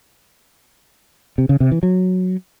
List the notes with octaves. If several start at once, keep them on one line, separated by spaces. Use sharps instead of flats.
C3
C#3
C3
E3
F#3